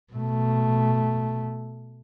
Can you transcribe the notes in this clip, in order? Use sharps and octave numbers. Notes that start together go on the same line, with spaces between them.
B2 A3